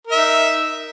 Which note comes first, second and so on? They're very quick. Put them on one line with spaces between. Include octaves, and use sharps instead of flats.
A#4 E5 D#4